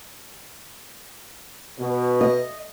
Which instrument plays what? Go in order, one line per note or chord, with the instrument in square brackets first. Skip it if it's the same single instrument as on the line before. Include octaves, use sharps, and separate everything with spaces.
[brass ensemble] B2
[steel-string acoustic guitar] D#5